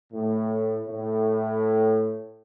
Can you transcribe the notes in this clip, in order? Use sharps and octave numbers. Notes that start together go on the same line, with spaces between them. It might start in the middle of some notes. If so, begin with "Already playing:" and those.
A2
A2